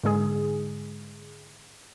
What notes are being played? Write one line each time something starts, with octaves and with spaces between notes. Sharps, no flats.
G#2 D3 G#3 G#4